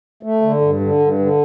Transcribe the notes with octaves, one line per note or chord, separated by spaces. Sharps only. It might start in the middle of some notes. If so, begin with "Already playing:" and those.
A3
D3
G2
D3
G2
D3